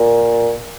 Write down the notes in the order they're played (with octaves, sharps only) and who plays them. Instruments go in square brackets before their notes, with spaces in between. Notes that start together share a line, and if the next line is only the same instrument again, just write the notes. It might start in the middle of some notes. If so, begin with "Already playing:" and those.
Already playing: [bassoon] A#2